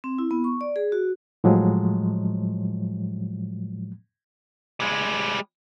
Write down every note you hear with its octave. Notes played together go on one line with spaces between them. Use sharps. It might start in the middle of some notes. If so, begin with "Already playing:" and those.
C4
E4
B3
C#6
D5
G#4
F#4
A2 F3 F#3 G#3
G3 G#3